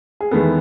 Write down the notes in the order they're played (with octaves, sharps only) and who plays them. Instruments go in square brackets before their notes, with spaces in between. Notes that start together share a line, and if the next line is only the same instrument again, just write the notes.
[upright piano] G#4
E2 D#3 G#3 B3 A4